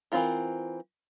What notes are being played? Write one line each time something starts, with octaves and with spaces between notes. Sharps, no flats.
E3 G3 C4 F4 A#4